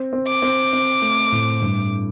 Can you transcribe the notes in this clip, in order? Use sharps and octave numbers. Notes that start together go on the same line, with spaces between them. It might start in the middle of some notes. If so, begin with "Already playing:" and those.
Already playing: C4
C4
D6
C4
C4
A3
A2
G2